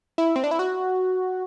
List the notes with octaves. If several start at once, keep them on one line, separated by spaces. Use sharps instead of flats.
E4
C4
D4
E4
F#4